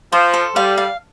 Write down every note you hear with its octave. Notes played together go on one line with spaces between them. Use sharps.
F3 C5
A4
G3 F5
F5